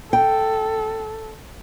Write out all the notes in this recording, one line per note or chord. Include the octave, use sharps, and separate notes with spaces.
A4 G5